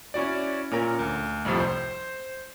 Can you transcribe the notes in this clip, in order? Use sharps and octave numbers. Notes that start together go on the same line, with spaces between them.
C#4 E4 F#4 D5
A#2 C#4 A#4 A#5
D2
C2 F2 A2 C3 F3
C5